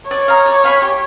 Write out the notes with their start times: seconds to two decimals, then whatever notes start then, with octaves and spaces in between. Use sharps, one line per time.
0.10 C#5 D5
0.28 F5 A#5 D#6
0.46 D5
0.64 F5 G#5 B5
0.82 G4